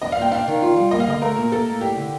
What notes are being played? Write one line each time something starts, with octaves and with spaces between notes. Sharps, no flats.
D4 D#5
F5
A#2 G5
D4 F5
D#3
F4
G3
A#3 D#5
F5
D3 D#5
A3 A#4
A#2
A#3 A4
A2
D4 G4
D3